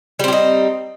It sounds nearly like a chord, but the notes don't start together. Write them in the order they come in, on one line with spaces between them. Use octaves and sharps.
G3 C4 G4 D#4